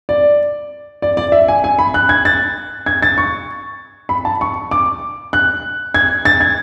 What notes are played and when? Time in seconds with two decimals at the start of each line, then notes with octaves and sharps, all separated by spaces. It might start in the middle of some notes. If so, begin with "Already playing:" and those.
0.09 D5
1.02 D5
1.17 D5
1.32 E5
1.48 G#5
1.64 G#5
1.79 B5
1.94 F#6
2.09 G#6
2.25 A6
2.86 G#6
3.02 A6
3.18 C#6
4.09 B5
4.25 A5
4.41 C#6
4.71 D6
5.33 F#6
5.94 G#6
6.25 A6
6.41 G#6